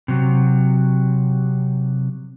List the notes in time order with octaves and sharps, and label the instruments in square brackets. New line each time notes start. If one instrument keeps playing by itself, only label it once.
[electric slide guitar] C3 F#3